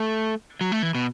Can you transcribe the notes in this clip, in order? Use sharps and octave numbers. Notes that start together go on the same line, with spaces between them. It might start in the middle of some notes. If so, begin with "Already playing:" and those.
Already playing: A3
F#3
A3
E3
B2